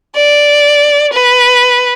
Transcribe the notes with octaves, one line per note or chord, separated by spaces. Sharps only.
D5
B4